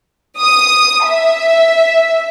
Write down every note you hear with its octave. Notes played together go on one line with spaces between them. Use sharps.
D#6
E5